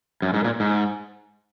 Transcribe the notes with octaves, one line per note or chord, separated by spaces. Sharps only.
F#2
G#2
A#2
G#2